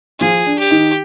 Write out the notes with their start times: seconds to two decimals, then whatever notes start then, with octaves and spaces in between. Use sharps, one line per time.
0.20 F3 F4 G#4
0.46 D4
0.59 G4
0.70 D#3 D#4